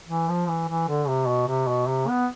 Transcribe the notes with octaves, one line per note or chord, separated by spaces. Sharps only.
E3
F3
E3
E3
D3
C3
B2
C3
B2
C3
B3